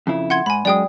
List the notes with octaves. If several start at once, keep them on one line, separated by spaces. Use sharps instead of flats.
F2 C#3 E4
F#5 C6 G#6
G#2 G#5 B5
F#2 G#3 D5 G5 D#6